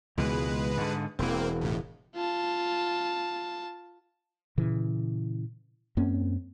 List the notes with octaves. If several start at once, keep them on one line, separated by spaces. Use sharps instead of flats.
C#2 B2 E3 G#3 B4
G#2 D3
E1 E3 A#3 C4
C#2 A2
F4 A5
A#2 C#3 E3
F#2 A#3 C4 C#4